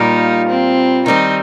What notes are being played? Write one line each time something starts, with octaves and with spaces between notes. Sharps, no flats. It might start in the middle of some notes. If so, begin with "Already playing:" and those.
Already playing: A#2 G3 A#3 D#4 F4 A#4
C4
D#3 G3 C4 D#4